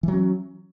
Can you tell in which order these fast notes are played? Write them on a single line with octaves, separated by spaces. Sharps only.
E3 F#3 C#4